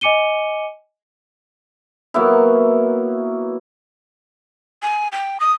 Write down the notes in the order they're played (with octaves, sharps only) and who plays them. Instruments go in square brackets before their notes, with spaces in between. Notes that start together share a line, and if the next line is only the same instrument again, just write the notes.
[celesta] D#5 G#5 D6 C#7 D#7 G7
[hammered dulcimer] F#3 A#3 B3 E4
[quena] G#5
G5
D#6